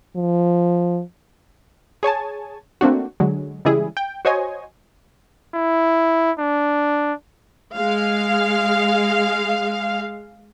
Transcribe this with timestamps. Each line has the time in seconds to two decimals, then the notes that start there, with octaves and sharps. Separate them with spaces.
0.16 F3
2.03 G#4 C#5 G#5 A5
2.81 A3 A#3 C4 D4 F#4
3.20 D3 F#3 G#3
3.65 C#3 E3 G3 G#3 E4 G#4
3.97 G5
4.25 F#4 C5 C#5 D#5 G#5
5.54 E4
6.39 D4
7.77 G#3 F5